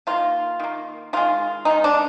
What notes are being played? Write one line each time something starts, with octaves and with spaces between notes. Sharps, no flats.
D#3 A#3 F4
D#3 A#3
D#3 G#3 F4
D#3 G#3 D#4
D4